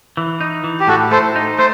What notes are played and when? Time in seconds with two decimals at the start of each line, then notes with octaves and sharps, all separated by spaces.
0.17 E3
0.40 D#4
0.64 E3
0.80 G4
0.87 A2 F#4 A4
1.11 A3 A4 C5
1.36 D#4
1.58 A3 C5